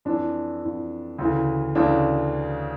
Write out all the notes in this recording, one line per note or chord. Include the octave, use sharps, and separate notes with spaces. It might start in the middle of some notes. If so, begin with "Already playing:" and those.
F2 E3 D4
F2 E3
D2 C#3 E3
D2 C#3 E3 D4